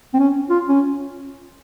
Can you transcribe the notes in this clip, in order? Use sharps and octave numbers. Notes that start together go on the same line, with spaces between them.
C4
C#4
F4
C#4